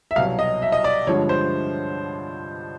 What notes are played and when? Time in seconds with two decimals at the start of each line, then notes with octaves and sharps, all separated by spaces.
0.11 E5
0.16 C2 B2 F#3 F5
0.39 D#5
0.62 E5
0.72 D#5
0.84 D5
1.07 G2 D3 F3 G#3 C#5
1.29 C5